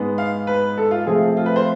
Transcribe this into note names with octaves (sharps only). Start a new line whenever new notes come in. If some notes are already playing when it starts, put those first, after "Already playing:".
Already playing: G#2 G#3 B3
F5
B4
A4
F4
C3 F3 A3 C4 G#4
F4
B4
C5